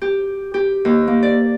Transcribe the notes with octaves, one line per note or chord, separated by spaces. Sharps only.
G4
G4
D#2
A#3
D5